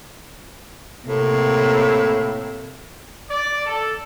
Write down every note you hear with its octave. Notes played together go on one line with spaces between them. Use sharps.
A2 C3 A#3
D5
A4